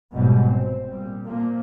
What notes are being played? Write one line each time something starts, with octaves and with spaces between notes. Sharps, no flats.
F1 G#2 B2 F#3 G3
C4
A#2 G3
A#2 F3 A#3